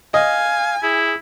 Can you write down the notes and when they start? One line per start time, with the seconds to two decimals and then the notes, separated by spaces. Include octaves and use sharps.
0.14 D#5 F5 G#5
0.83 E4 G#4